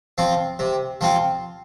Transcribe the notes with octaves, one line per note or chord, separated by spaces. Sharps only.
F3 C4 F4
C3
F3 C4 F4